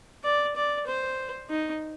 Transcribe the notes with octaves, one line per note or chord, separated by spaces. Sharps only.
D5
D5
C5
D#4